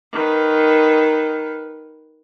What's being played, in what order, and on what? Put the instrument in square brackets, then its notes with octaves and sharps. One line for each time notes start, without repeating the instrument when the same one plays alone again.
[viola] D#3 B4